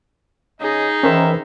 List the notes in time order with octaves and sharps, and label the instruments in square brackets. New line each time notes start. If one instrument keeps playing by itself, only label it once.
[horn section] C#3 D#5 [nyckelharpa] D#4 G#4
[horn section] D#3 E5 [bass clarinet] E3 [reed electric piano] C#4 A#4 C5